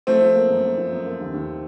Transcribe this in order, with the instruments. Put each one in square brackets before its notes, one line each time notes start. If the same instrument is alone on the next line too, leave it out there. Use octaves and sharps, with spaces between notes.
[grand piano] F3 [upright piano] A3 C4
[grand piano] F3
A#3
F#2
A#3
F3
F#2
A#3
D#2
D#2